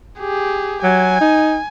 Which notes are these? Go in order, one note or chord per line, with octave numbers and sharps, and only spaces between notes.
G4 G#4
F#3 G#5
D#4